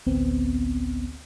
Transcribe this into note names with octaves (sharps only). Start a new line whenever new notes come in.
A1 D2 B3 C4